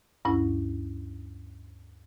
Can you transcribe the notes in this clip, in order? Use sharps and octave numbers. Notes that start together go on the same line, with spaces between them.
D2 G2 C#4 E4